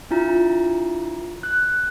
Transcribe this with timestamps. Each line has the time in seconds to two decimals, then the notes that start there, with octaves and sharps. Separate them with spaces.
0.11 D4 E4 F4 A#5
1.43 F#6